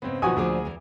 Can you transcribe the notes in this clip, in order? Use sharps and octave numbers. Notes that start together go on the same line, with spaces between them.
G#2 C#3 B3 C4
B1 D#3 F3 B3 F#4 G#5 D#6
D2 A#2 D3 F3 G#4 D6
E2 E3